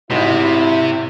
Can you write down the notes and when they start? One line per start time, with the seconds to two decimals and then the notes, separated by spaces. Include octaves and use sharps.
0.10 G#1 C3 E4 F#4 D#5